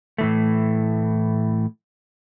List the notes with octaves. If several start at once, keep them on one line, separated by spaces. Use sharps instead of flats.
A2 E3 A3